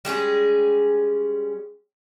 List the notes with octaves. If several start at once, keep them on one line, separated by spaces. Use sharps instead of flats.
G3 G#3 C#4 G#4